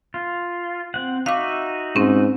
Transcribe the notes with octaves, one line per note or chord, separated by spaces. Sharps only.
F4
C4 F#5
D#4 F#4 E5 F5 D6
G#2 C4 C#4